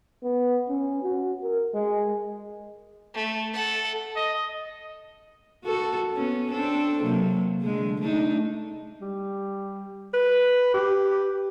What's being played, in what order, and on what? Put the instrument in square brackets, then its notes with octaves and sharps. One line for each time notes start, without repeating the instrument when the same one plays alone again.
[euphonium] B3
C#4
F#4
A#4
G#3
[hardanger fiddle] A3
A4 F#5
[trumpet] D#5
[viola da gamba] F#4 A4
B3 C#4
C4 D4 A4
C3 F#3 A#3
D3 G#3
A3 D4 D#4
[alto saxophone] G3
B4
G4